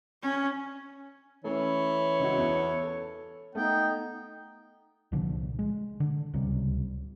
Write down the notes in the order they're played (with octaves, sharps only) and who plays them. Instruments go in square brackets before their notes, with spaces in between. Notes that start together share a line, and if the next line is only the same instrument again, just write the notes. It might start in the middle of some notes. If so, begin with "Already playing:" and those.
[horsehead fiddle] C#4
[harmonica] E3 [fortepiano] A3 C#4 [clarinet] C#5
[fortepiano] C#2 D#4 F#4
E2
A4
[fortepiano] A3 [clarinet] B3 [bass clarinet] D#4 [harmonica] G5
[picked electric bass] C2 A#2 D3 F3
G#3
D3
D1 C#2 C3 G3